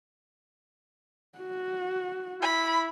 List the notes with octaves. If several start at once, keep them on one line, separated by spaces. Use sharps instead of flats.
F#4
E4 B5